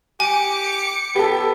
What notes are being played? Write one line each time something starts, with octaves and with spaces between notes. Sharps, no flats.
G4 G#5 D6 C#7
B3 G4 A4